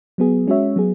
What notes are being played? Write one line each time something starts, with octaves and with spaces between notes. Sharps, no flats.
F#3 B3 G#4
G#3 C#4 F#4 C#5 E5
F#3 B3 G#4